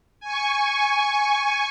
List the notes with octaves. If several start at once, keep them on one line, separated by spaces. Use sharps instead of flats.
G#5 C#6